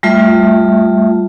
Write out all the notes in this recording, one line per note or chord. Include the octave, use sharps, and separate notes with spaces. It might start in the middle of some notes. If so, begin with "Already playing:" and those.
G3 A3 F4 E5